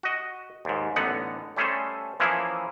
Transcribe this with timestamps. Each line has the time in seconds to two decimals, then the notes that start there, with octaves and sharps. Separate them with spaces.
0.03 F#4 D#5
0.65 D#2 G#2
0.96 A1 D3 B3 D#4 F#5
1.57 G3 A3 C#4 G#4 A4 C5
2.20 E3 F3 A#3 C#4 E4 G#4